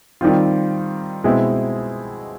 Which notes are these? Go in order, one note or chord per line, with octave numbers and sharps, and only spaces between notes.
D#3 G3 C4 F4
B2 G#3 C4 E4